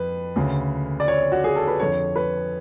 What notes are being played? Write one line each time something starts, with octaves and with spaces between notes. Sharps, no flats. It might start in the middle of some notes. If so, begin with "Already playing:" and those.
Already playing: F2 B4
D2 C#3
D5
C#5
F#4
G#4
A4
B4
F2 D3 C#5
B4